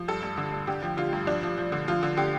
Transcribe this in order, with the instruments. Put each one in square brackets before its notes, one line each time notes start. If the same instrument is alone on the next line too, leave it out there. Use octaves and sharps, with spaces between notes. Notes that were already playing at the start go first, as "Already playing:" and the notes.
Already playing: [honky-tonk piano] F3
G2 A4
G2
D3
G2
D3 G4
F3
D3 F4
G2
F3 D4
F3
F3
D3
F3 F4
D3
D3 G4